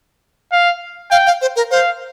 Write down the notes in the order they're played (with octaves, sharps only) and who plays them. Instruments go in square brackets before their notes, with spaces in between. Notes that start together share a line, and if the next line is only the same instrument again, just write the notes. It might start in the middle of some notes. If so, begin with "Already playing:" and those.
[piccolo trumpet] F5
[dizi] F5 [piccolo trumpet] G5
[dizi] F5
C5
A#4
[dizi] C5 [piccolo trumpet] F5